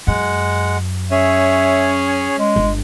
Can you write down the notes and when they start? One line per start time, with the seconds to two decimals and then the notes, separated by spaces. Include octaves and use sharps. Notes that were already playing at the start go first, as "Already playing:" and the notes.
0.07 F#2 G#3 F#5
1.11 C#4 G#4 C#5 E5
2.39 G#3
2.56 G1